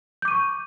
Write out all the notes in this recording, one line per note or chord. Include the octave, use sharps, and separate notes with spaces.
C#6 D6 G6 D#7